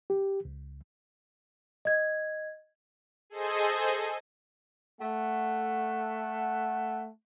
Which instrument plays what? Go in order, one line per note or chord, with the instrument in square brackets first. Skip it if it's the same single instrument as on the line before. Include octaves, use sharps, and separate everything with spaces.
[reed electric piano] G4
C#2
[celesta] D#5 G#6
[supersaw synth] G#4 A4 C5 D#5 G#5
[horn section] A3 F#5